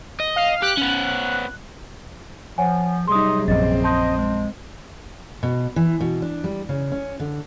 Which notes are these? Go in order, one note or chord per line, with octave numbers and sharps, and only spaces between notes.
D#5
F5
G4 F#6
B3 C#4
F3 C#5 F#5 G#5
C3 F#3 G3 D#4 G#4 C6 D#6
A#1 F#2 C4 D#5 A6
D#5 A5 C6 G6
G#3
B2
E3
B2
D4
G3
C#3
C#4
D3